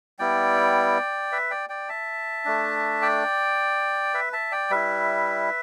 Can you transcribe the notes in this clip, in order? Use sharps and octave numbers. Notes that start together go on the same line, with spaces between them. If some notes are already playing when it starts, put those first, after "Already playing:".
G3 B3 E4 D5 G5
B4 E5
D5 G5
D5 G5
E5 A5
A3 D4
D5 G5
B4 E5
E5 A5
D5 G5
G3 E4 B4 E5